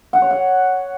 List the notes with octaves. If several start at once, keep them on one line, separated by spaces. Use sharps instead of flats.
F#5
C#5
F#5